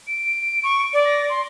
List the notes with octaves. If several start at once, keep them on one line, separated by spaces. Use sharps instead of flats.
D7
C#6
D5
A#6
C6